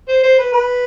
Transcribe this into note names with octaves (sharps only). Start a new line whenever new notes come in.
C5
C5
B4
B4